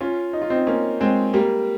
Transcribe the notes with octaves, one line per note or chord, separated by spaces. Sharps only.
C#4 F4
D#4
F4
C4 D#4
A#3 C#4
G#3 C4
G3 A#3